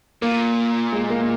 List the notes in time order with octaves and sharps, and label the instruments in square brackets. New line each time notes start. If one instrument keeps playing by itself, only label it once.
[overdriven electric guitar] A#2 [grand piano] A#3
[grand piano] G#3
A#3
A#3